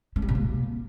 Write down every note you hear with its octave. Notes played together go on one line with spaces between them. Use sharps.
G#3
G3
B2
A#3